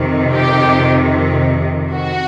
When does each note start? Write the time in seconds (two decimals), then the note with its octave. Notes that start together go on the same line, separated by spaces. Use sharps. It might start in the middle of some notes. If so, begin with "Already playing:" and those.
Already playing: F2 C3 D#3
0.33 G4
1.94 F#4